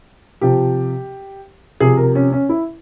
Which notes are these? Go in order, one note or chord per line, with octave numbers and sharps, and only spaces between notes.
C3 F3 G4
C3 F3 G#4
A#4
C#4
C#4
E4